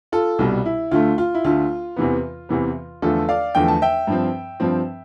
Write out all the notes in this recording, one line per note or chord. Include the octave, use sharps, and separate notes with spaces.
F4 A4
C2 B2 G3
E4
D2 D3 A3 F4
F4
E4
D2 D3 A3 F4
E2 C3 E3 B3
E2 C3 E3 B3
E2 D3 F3 A3 F4 A4
D5 F5
E2 D3 F3 A3 G5
A5
E5 G5
G2 F3 C4
G2 F3 C4